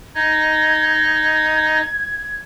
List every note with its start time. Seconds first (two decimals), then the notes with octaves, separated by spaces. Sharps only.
0.15 D#4 D#5 G#6